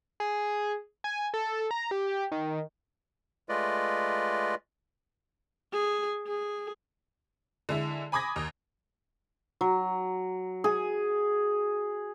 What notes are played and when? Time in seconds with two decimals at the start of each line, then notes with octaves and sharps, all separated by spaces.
0.20 G#4
1.04 G#5
1.34 A4
1.71 A#5
1.91 G4
2.32 D#3
3.49 G#3 A3 F4 B4 D5 D#5
5.73 G#4
6.27 G#4
7.69 D3 G#3 E4
8.12 G#5 B5 D6 D#6 G#6 A#6
8.36 D#2
9.61 F#3
10.64 G#4